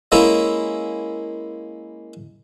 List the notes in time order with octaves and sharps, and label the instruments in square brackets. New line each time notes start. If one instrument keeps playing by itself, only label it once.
[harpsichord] G#3 A#3 C#4 E4